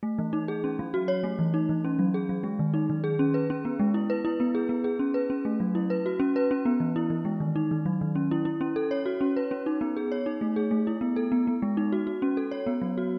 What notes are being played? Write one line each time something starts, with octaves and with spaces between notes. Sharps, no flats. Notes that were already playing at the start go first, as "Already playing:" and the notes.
A3
E3
D#4
G#4
C#4
F#3
F#4
C#5
A3
E3
D#4
E3
C#4
F#3
G#4
F#3
G#3
D#3
D#4
D#3
G#4
C#4
B4
C#4
B3
G#3
E4
B4
E4
B3
G#4
B3
G#4
C#4
B4
C#4
A3
F#3
E4
B4
F#4
C#4
B4
C#4
B3
E3
E4
E3
G#3
D#3
D#4
D#3
F#3
D#3
C#4
E4
E4
C#4
A4
C#5
F#4
C#4
B4
C#4
D#4
B3
G#4
C#5
D#4
A3
G#4
A3
E4
B3
A4
B3
B3
G#3
D#4
F#4
F#4
C#4
A4
C#5
B3
F#3
F#4